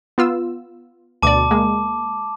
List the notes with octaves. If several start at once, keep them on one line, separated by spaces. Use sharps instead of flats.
B3 F4 E6
D2 B2 D5 A5 D6
G#3 A#3